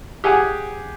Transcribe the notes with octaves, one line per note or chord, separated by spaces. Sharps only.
G4 G#4 F#5 G#5